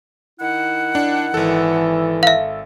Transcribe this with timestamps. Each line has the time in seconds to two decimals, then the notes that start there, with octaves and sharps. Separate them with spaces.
0.40 D#3 E4 F#5
0.95 D4
1.34 G#1 E3 A4
2.23 E5 F5